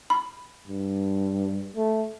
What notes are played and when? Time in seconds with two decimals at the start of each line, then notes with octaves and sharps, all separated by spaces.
0.10 B5
0.68 G2
1.76 A3